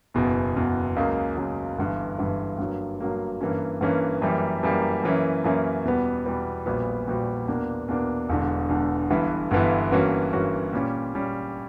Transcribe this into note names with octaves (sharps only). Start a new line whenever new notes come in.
F#1 E2 B2
F#1 E2 B2
C#2 C#3 F#3 A#3
C#2 C#3 F#3 A#3
G1 G2 E3
G1 G2 E3
G2 F#3 A#3
G2 F#3 A#3
G2 E3 A#3 C#4
G2 E3 A#3 C#4
F#2 E3 G3 A#3
F#2 E3 G3 A#3
F#2 E3 A#3 C#4
F#2 E3 A#3 C#4
E2 B2 G3 B3
E2 B2 G3 B3
A#1 A#2 G3 B3 F#4
A#1 A#2 G3 B3 F#4
E2 B2 A#3 D4
E2 B2 A#3 D4
E1 E2 D3
E1 E2 D3
G1 G2 E3 B3 E4
G1 G2 E3 B3 E4
G2 E3 A#3 C#4 F#4
G2 E3 A#3 C#4 F#4
A#2 G3 C#4
A#2 G3 C#4